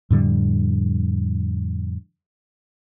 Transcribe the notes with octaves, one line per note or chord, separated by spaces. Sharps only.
F2 A2 D3 G3